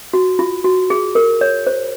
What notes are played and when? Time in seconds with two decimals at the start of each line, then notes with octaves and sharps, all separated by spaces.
0.13 F#4
0.39 F4
0.65 F#4
0.90 G#4
1.15 A#4
1.41 C#5
1.67 C5